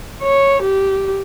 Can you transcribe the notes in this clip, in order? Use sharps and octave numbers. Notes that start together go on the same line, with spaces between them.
C#5
G4